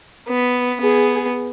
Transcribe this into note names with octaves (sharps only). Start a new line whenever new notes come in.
B3
B3 G#4